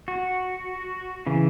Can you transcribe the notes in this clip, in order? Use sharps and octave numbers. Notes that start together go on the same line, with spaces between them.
F#4
C#3 E3